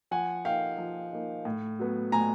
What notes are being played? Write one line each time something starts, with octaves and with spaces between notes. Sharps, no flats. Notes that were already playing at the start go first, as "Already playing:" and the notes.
F3 F#5 G#5
A#3 D#4 F5 G5
F3
A#3 D#4
A2
F#3 B3
A2 G#5 A#5